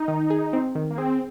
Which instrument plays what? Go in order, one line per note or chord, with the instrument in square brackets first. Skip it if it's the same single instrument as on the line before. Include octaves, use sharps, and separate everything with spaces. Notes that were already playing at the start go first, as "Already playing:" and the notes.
Already playing: [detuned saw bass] D#4
[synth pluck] D#3
G#4
C4
D#3
[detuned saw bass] A#3
[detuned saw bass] C4 [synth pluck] G#4